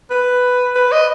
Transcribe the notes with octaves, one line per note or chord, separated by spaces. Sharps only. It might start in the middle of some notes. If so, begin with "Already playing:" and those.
B4
B4
D#5